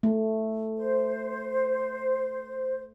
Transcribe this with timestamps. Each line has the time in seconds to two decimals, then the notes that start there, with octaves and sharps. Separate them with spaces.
0.03 A3
0.77 C5